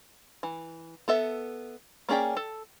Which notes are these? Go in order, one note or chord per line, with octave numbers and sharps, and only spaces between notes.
E3
B3 A4 E5
A#3 C#4 G#4 D5 G5
A4